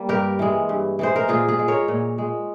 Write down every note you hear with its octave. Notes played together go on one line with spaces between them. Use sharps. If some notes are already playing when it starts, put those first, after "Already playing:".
Already playing: G3 A#3
G2 G4 A#4
E3 G#3
G2
E3 G#3 C5
A#4
A#2 F4 G#4
F4 G#4
G#3
A#4 C#5
A#2
G#3